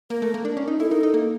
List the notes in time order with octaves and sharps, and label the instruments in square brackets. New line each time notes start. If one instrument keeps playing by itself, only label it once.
[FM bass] A#3 [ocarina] A#4
[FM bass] A3
A#3
D4
C#4
D#4
[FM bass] E4 [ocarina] A4
[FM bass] D#4 [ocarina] A#4
[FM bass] D#4 [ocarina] A4
[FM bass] A#3